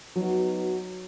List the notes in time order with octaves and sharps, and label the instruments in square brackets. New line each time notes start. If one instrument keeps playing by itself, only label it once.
[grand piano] F#3 [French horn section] B3 D#4 F#4